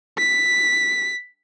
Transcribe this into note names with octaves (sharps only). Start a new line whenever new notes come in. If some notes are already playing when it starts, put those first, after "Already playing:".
B6